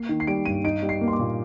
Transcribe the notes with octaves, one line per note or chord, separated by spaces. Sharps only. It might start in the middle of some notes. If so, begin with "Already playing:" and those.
Already playing: A#3 C7
D#3
C7
G3 D7
G2 D#7
D#4 D7
G3
C7
A#3
C6
D6
A#2